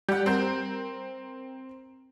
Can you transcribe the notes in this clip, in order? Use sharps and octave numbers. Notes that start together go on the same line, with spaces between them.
G3 G4 F#5
C4 A#4 G6